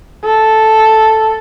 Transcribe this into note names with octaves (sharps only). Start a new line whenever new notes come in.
A4